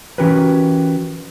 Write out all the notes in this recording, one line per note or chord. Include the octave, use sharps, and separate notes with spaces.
E3 C#4 F#4 G4 A#4 B4